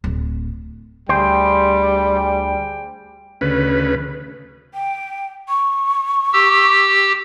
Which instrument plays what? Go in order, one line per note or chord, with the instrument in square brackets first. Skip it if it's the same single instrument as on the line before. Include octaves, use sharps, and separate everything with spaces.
[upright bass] D1
[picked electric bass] D2 [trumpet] G3 [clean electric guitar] G#4 C5 [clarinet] G5
[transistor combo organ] D2 C#3 B4
[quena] G5
C#6
[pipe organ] G4 E6